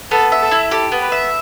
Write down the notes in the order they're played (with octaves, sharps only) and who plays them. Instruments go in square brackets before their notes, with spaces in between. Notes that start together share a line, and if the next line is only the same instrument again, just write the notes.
[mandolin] B3 [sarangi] A4
[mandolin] E5
[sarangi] A4
[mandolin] E4
[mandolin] G4 [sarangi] A4
[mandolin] B3
[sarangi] B4
[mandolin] E5